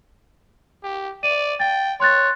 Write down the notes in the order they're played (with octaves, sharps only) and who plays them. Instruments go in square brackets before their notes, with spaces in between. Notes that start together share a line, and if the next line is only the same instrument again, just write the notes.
[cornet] G4
[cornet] D5 [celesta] D#7
[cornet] G5 [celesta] A6
[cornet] C#5 [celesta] C6 F#6 A6